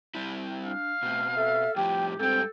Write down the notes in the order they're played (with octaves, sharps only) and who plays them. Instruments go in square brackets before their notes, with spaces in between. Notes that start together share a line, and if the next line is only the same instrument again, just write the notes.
[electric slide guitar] G3 C4 E4
[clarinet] D4 [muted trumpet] F5
[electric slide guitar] B2 C4 [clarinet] A3
[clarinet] A4 [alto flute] E5
[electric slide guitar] F2 A2 F3 [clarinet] G4 [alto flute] G5
[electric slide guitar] G#2 G3 [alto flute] C4 [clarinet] A4 [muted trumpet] G5